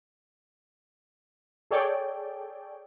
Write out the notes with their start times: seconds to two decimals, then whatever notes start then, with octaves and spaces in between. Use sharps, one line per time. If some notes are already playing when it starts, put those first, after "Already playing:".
1.71 G#4 A4 C#5 D5 G5